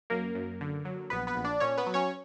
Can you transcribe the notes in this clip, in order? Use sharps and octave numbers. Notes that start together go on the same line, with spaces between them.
F#2 A#3 A#4
F#2
D3
F#3
A#1 B3 B4
B3 B4
A#1
D4 D5
A#2 C#4 C#5
B3 B4
F#3
C#4 C#5